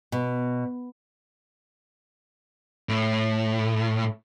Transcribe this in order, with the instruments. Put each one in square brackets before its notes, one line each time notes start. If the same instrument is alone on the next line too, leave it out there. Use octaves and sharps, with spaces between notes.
[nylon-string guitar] B2
[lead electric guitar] A2